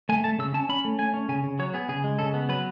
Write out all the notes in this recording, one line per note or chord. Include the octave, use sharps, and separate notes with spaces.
A3 G#5
A3 A5
C#3 E6
C#4 A5
C#4 B5
A3
A3 G#5
C#4
C#3 G#5
C#3
F#3 C#5
B3 G#4
C#3 G#4
G#3
C#3 A4
B3
F#3 B4